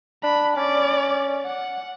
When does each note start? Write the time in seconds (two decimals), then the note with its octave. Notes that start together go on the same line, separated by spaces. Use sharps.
0.23 D4 B5
0.57 C#4 D5
1.45 F#5